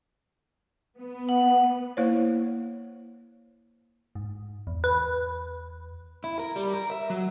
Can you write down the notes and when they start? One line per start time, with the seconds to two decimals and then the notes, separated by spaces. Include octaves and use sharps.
0.97 B3
1.29 F#5
1.97 A#3 E4 C5 C#5
4.15 G#2
4.67 E2
4.84 B4
6.24 E4
6.39 A#4
6.56 G3
6.74 A#4
6.91 E5
7.10 F#3